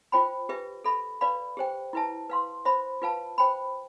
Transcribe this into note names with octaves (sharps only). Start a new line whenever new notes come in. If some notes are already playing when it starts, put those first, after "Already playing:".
F4 C5 G5 B5
G4 B4 E5
A4 E5 B5
B4 D5 F5 B5
G4 C5 G5
E4 B4 E5 A5
B4 F5 C6
C5 E5 B5
F4 B4 F5 A5
C5 G5 B5